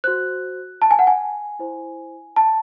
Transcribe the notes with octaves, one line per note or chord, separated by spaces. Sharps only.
F#4 C5 F#6
A5
G#5
F#5
G#5
E4 C5
A5